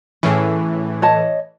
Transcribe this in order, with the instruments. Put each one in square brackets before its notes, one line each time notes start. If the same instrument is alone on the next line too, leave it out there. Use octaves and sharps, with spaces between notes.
[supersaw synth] A2 E3 [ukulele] C#4 E4 G#4
[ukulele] C#5 D#5 A5